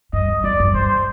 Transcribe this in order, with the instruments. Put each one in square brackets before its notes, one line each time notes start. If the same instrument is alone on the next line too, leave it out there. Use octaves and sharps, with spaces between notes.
[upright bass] G2 [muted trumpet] D#5
[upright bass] G2
[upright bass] F2 [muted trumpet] D5
[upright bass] G2
[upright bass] G2 [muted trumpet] C5